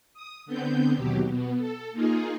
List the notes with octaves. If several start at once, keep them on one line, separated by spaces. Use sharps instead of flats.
D#6
D3 B3 C4 G6
D#2 B2 F#3 G4
B2 B3
A4
A#3 D#4 F4 G#4